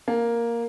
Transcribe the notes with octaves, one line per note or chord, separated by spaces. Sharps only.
A#3